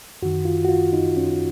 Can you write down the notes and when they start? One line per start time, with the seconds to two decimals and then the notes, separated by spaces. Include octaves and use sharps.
0.22 F#2 D#3 F#4
0.45 F4
0.65 F#4
0.69 F4
0.93 D#4
1.17 C#4